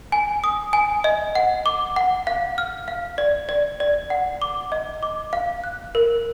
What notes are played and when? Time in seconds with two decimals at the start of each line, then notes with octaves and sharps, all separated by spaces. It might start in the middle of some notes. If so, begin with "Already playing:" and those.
0.12 G#5
0.44 D#6
0.73 G#5
1.04 D#5
1.35 F#5
1.66 D6
1.96 F#5
2.27 F5
2.58 F6
2.88 F5
3.18 D5
3.49 D5
3.80 D5
4.10 F#5
4.42 D6
4.72 D#5
5.03 D6
5.33 F5
5.64 F#6
5.95 A#4